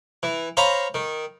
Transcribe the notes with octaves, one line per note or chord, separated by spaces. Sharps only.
E3
C5 C#5 F5 A#5 B5
D#3